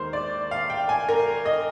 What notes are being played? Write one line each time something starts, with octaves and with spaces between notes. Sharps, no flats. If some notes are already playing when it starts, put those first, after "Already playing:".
Already playing: D#2 D#3 G#3 D#4 A#4 C5
D5
F5
G5
G#5
A#4
D#5